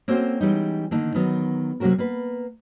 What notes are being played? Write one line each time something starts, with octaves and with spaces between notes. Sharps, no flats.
A#3 C4 C#4 F#4 A4 C5
E3 G3 G#3 B3 C#4 D#4
D3 D#3 A#3 D#4
D#3 F#3 B3
C3 F#3 A#3 C#4 F#4 A#4
A#3 B3 B4